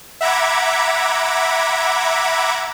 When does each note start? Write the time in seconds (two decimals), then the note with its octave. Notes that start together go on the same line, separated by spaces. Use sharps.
0.21 E5 F#5 A#5 B5 D6 G#6